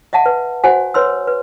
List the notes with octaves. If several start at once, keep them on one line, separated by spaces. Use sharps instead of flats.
D#5 E5 F#5 A5
B4
F#4 C5 F#5 G#5
B4 C#5 C6 E6
B4